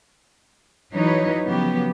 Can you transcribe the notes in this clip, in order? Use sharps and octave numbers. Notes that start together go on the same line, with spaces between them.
E3 F#3 D#4 E4 B4 C#5
C#3 F3 F#3 B3 G4